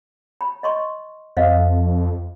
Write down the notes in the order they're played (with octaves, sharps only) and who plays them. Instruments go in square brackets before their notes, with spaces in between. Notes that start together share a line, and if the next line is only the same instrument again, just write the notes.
[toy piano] B5
D#5 C6 C#6
[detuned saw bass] F2 [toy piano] C5 D#5 F5